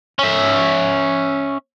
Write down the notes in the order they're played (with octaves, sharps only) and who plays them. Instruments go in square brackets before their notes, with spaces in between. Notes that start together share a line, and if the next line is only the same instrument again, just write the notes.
[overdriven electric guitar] C#4 E5